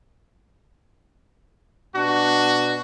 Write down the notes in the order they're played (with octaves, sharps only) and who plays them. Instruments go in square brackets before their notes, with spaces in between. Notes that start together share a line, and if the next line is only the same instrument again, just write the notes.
[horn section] B2 D4 F#4